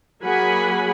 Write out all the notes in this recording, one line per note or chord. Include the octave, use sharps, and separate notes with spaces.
F#3 A#3 G#4 F#5 G#5 B5